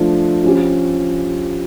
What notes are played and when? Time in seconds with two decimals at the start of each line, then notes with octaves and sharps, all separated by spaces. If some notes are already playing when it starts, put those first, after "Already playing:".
Already playing: F3 A3 D4
0.44 F3 C#4 G4